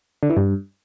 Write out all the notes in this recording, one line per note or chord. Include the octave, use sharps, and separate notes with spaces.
D3
E3
G2